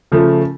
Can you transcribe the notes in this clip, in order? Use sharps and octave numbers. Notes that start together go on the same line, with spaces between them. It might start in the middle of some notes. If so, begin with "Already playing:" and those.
C#3 F3 A3